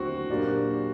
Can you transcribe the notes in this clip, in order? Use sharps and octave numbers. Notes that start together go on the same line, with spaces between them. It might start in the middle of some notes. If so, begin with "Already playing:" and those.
Already playing: D#2 D3 F#3 A3 C4 F#4
A#2 F#3 A#3 D4 G4